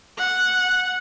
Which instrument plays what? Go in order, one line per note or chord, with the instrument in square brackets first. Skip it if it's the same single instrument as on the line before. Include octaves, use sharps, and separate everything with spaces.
[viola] F#5